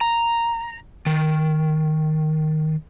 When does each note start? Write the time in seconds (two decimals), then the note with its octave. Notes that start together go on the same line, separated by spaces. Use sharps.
0.01 A#5
1.06 D#3